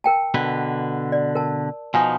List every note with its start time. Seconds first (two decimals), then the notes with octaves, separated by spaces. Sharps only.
0.04 A#4 G5 A5
0.34 B2 D3 B4
1.12 D5
1.35 A#4 A5
1.94 B2 F3 D#4 G#5